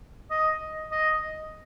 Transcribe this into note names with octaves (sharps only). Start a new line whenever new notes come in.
D#5
D#5